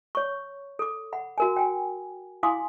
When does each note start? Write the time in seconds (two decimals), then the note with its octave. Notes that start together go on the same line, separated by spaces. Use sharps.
0.15 C#5 C#6
0.79 A4 D6
1.13 F#5 B5
1.38 F#4 A#4 G#5
1.56 G5 G#5
2.43 E4 F5 G#5 C6 D6 D#6